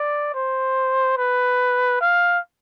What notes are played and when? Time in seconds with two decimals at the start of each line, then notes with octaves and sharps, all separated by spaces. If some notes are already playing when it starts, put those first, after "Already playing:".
Already playing: D5
0.34 C5
1.17 B4
2.01 F5